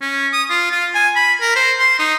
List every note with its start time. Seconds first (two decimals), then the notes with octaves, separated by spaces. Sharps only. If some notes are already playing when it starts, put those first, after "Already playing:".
0.01 C#4
0.33 D#6
0.50 F4
0.72 F4
0.95 G#5
1.16 B5
1.41 A#4
1.56 C5
1.79 C6
1.99 D#4